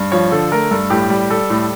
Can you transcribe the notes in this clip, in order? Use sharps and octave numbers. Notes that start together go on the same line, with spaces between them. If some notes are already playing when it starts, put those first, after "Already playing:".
Already playing: G2
F3 C#5
D3 A4
A3 A#4
G2 A4
A2 G4
G3
G3 A4
A2